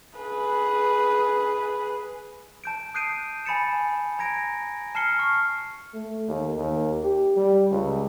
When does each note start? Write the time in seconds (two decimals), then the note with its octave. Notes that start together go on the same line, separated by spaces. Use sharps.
0.19 G#4 B4
2.64 A5 G6 D7
2.94 D#6 F#6 G6 C7 D7 D#7
3.45 G#5 B5 A6 C#7 E7
4.19 A#5 G#6 A#6 D7
4.95 A5 F6 C7 C#7 G7
5.19 C#6 F6 C7
5.94 A3
6.28 D#2
6.58 D#2
7.03 G4
7.36 G3
7.71 C#2